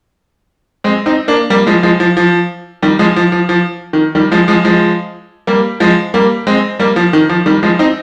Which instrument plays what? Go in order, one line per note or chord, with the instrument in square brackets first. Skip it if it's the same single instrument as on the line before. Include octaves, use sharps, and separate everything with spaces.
[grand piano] G#3 C4
C4 D#4
A#3 D4
G3 A#3
F3 G#3
F3 G#3
F3
F3
D#3 G3
F3 G#3
F3
F3
F3
D#3
D#3 G3
F3 G#3
F3 G#3
F3 G#3
G3 A#3
F3 G#3
G3 A#3
G#3 C4
G3 A#3
F3
D#3
F3
D#3 G3
F3 G#3
C4 D#4